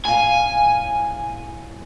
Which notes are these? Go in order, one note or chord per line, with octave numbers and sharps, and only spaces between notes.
A2 F5 G#5